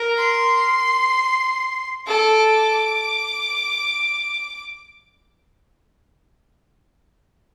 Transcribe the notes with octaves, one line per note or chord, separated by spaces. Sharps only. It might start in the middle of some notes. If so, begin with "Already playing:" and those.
Already playing: A#4
C6
A4 D6